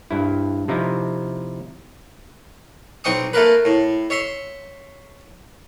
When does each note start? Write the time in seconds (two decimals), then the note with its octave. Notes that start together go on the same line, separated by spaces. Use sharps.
0.11 G2 E4
0.68 C3 F3 D#4 E4
3.04 B1 C4 G5 C#6 D#6
3.33 A3 A#3 A#4 B4
3.65 A2
4.10 C#5 E5 C6